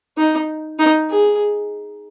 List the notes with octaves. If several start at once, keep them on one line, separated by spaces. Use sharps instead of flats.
D#4
D#4
G#4